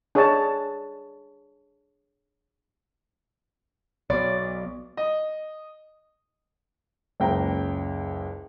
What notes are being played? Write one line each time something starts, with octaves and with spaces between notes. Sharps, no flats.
D4 G#4 C#5 D#5 A5
B1 B2 D5
D#5
F#1 C#2 G5 A#5